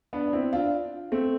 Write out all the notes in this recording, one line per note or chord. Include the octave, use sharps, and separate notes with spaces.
B3 D4
D4
C4 E4
D4 F4
A3 C4